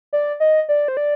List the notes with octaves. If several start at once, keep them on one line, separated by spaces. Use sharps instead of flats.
D5
D#5
D5
C5
D5